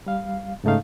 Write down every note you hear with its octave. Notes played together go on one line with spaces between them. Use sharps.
G3 F5
G#2 C#3 A3 D#4 F5